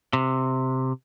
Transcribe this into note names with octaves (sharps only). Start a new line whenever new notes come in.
C3